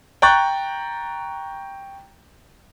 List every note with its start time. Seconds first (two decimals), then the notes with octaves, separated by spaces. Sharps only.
0.22 G5 A#5 C#6 F#6 G6 A6